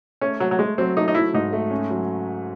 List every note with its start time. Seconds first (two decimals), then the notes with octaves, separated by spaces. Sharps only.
0.21 A3 C#4
0.40 F#3 A3
0.51 F#3
0.59 G#3 A3
0.78 F#3 C4
0.97 A3 D#4
1.08 D#4
1.15 F#3 E4
1.34 G#2 D#4
1.53 A3
1.71 C#4
1.90 F#3